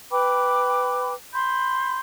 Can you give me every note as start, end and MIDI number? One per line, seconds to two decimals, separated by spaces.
0.12 1.13 71
0.12 1.13 79
0.12 1.13 83
0.12 1.13 86
1.34 2.00 83
1.34 2.00 84
1.34 2.00 91